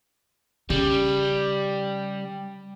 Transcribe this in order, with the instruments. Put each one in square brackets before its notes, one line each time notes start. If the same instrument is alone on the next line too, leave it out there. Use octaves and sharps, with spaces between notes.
[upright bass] C#3 [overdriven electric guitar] G3